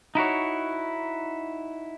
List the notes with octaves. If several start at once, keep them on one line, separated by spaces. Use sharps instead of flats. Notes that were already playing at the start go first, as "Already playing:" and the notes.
D#4 E4 F#4 C#5